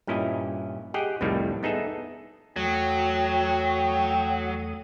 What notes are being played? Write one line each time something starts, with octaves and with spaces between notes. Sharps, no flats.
G2 A#2 C#4 E4 D#5
G4 G#4 D#5 F#5 G5
C2 F2 A2 D#3 G3
B3 D#4 G#4 A4 E5
E2 F#3 A3 G5 D#6